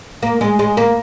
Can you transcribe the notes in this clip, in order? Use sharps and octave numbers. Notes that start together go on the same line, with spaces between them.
A#3
G#3
G#3
A#3